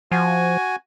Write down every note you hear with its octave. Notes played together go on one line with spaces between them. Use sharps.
F3 F#4 G#5